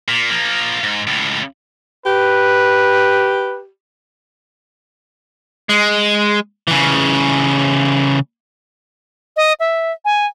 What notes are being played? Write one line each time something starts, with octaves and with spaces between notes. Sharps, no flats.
A#2
F3 A#3
G#2
C#2 A2
G4 B4
G#3
C#3 E3
D#5
E5
G#5